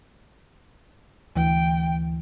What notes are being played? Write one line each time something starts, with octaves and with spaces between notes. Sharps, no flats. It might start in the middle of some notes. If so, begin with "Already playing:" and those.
D2 E3 G5